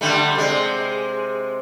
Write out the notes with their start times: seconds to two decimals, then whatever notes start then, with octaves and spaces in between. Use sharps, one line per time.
0.01 D3 G3 A3
0.35 C3 G#3